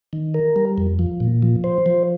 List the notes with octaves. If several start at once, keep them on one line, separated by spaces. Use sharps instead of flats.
D#3
A#4
G3
F2
F3
A#2
F3
C5
F3